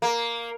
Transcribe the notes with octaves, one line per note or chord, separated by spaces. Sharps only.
A#3